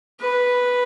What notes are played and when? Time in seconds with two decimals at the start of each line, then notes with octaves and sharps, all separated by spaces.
0.21 B4